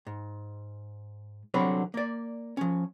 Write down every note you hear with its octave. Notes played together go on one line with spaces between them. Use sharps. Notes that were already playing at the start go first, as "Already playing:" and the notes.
G#2
C2 D3 F#3 C4 C#5 B5
A#3 D5
F3 C#4